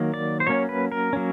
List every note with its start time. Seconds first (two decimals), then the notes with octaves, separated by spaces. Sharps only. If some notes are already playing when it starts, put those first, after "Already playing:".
Already playing: D#3 F#3 A#3
0.14 D5
0.40 C5
0.47 F#3 A#3 C#4 C#5
0.69 B4
0.92 A#4
1.13 F#3 A#3 C#4